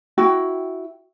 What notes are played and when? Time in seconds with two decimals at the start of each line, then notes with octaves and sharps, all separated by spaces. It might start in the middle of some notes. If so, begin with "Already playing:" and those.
0.18 E4 F#4 G5